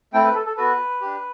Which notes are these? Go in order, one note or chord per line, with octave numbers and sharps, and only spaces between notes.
A3 C4 E4 A4 G5
B4
A4
A4
B3 F#4 A4 B4
D4 G4